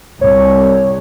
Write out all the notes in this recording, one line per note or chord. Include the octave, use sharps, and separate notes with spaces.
C2 C#5